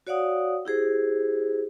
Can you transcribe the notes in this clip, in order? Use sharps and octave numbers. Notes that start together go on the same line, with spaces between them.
F#4 C#5 D5 F5 F#5 D#6
E4 G4 G#4 C5